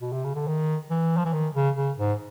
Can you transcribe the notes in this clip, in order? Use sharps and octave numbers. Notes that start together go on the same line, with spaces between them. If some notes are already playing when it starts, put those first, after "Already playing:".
B2
C3
C#3
D3
D#3
E3
F3
E3
D#3
C#3
C#3
G#2